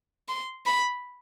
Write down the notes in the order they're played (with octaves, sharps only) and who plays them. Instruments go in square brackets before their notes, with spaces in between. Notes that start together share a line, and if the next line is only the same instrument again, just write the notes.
[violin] C6
B5